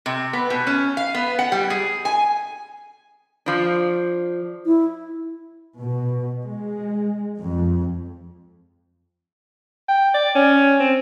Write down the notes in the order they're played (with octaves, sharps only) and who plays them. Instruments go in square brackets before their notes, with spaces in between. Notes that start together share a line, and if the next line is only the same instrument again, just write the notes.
[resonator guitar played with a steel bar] C3
B3
B2
C#4
F5
B3
F#5
G3
G#4
G#5
F3 D4
[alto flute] E4
[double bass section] B2
G#3
F2
[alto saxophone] G5
D5
C#4
C4